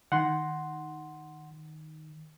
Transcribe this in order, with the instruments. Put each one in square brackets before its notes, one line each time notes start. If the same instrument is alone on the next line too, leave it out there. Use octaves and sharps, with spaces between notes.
[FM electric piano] D#3 [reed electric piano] F#5 C6